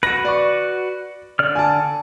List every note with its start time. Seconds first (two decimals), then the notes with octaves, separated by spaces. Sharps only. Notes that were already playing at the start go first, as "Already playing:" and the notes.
0.03 F#4 B4 A#6
0.25 D5 C#6
1.39 D3 D5 F6
1.55 G#5 A5